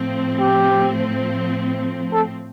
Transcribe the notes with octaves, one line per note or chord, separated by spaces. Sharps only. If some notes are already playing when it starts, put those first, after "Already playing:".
Already playing: A2 F3 C4
G4
A4